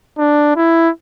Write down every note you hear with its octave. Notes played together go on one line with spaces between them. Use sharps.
D4
E4